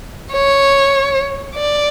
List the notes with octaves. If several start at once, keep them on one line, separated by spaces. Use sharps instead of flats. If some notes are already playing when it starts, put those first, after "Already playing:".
C#5
D5